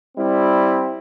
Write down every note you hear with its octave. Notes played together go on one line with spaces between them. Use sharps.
G3 C4 E4